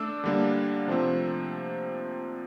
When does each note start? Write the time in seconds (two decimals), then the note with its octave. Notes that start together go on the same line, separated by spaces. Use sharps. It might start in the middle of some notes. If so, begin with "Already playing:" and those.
Already playing: A3 D4 D6 E6
0.24 D3 G3 A#3 D4
0.87 C3 F3 A3 C4